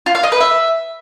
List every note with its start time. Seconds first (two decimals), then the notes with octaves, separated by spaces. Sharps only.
0.06 F4
0.15 F5
0.23 D#5
0.32 B4
0.40 E5